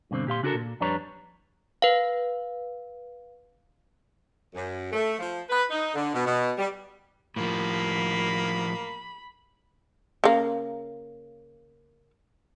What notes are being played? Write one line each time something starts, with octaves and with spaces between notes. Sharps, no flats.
G2 B2 D3 C4
A#2 G4 F5 C6
C#3 D4 F#4 G4 A4 A#4
A#2
F2 G3 D4 B4 C#5 A#5
B4 F5
F#2
A3
F3
B4
D#4
D3
B2
B2
G3
A2 F3 A#3 B5
C#3 A#3